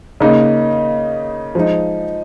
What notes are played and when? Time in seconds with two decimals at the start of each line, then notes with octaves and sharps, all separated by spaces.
0.20 C#3 A#3 D#4
1.55 F3 G#3 D#4